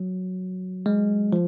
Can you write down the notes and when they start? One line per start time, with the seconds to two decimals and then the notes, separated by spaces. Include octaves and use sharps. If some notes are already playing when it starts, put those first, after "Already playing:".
Already playing: F#3
0.86 G#3
1.33 F3